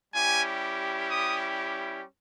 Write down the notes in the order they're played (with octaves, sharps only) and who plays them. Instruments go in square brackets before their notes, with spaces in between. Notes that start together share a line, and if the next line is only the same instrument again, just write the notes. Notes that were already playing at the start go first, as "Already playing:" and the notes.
[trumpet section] G3 C#4 E4 G4 G#5
D#6